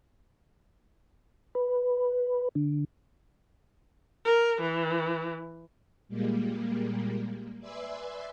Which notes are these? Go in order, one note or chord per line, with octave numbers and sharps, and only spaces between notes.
B4
D3
A#4
E3
A#2 G3 G#3 A#3
B4 D5 E5 G#5 C6 E6